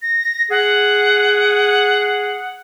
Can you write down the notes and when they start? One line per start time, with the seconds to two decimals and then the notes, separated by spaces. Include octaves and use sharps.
0.02 A#6
0.50 G#4 F#5